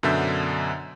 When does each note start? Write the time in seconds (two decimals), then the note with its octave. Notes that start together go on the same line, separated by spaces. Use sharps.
0.03 F#2 B2 D3 D4 E5 G6